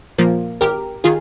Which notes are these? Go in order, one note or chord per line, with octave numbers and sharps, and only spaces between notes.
A#2 F3 A#3
G#1 G4 A#4
D#3 F4 G#4